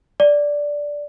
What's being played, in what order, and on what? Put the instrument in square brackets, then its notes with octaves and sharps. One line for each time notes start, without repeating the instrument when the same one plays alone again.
[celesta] D5